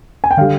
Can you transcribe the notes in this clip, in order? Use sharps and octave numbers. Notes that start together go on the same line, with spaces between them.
G#5
G5
D3 G3 F5